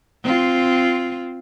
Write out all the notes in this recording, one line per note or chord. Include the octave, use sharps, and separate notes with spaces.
C4 F4